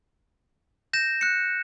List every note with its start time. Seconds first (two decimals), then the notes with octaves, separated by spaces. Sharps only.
0.93 G6 A#6 E7
1.21 F#6 C#7